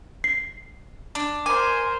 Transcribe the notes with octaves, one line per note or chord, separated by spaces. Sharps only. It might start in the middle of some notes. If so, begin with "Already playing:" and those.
C7
D4
A#4 C5 G#5 D6